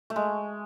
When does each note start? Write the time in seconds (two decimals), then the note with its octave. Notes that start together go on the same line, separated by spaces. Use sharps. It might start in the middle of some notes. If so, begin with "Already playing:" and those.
0.10 A3
0.16 G#3